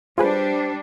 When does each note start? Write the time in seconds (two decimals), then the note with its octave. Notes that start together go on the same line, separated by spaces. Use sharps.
0.18 G3 D4 F4 G#4 B4 C5